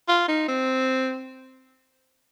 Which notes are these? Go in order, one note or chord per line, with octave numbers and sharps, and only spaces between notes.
F4
D#4
C4